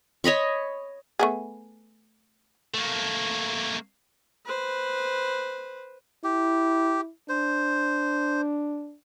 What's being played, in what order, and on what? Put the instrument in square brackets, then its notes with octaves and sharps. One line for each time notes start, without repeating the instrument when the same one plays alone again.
[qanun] C#5 D#5 B5 C#6
[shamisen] A3 B3 G#4
[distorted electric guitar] A3 A#3
[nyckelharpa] B4 C5
[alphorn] E4 [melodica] G4
[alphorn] D4 [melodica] C5